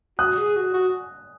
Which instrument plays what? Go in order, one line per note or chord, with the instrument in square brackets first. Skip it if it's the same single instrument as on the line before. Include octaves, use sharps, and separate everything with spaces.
[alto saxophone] F#4 [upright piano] D#6 F#6
[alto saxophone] G#4
F#4
F#4